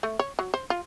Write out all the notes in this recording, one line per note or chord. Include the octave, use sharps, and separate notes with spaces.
A3
C#5
F#3
C5
F4